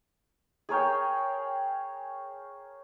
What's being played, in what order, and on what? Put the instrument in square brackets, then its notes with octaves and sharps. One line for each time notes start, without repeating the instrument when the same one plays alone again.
[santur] G#4 A#4 C#5 G5